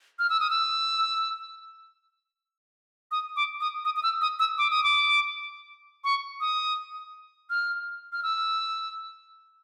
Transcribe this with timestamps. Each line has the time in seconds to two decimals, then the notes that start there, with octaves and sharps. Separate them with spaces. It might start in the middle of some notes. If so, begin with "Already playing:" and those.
0.19 F6
0.30 E6
0.40 D#6
0.50 E6
3.11 D#6
3.36 D6
3.60 D#6
3.85 D#6
3.96 D#6
4.03 E6
4.21 D#6
4.39 E6
4.58 D6
4.71 D#6
4.84 D6
6.04 C#6
6.41 D#6
7.50 F6
8.12 F6
8.23 E6